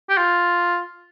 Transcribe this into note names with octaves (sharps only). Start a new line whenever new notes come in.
G4
F4